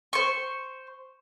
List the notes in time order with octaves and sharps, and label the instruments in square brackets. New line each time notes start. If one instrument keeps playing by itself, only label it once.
[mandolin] C5 C#6